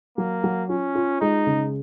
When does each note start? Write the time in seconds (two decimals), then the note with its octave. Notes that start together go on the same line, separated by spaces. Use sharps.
0.17 F#3 A#3
0.44 F#3
0.69 C#4 F4
0.95 F4
1.21 G#3 D#4
1.47 C#3